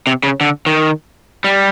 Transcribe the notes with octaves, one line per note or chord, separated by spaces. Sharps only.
C3
C#3
D3
D#3
G3